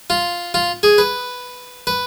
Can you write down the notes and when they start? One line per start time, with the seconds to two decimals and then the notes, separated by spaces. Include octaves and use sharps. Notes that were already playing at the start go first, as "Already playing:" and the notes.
0.10 F4
0.54 F4
0.83 G#4
0.98 B4
1.87 B4